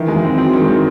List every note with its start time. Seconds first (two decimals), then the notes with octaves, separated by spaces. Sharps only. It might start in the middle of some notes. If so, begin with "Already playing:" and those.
Already playing: D#3 E3
0.08 G#3
0.16 E3
0.24 C4
0.38 F#3 C4
0.53 D#3
0.60 G#3
0.68 D#3